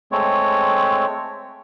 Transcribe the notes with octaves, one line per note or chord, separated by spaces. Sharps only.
G#3 A3 C4 C#5